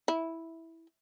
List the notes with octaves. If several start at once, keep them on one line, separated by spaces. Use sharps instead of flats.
E4